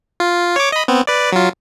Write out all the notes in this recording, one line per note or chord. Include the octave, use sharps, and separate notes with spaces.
F4
C#5 D6
D#5 B5
B3 C4
B4 D5
F#3 F4